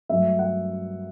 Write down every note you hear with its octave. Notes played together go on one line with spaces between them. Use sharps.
G2 F#3 A3 E5
F#5